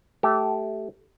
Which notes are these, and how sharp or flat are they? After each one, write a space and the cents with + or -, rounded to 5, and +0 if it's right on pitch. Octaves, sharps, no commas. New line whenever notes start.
A3 -10 G4 -20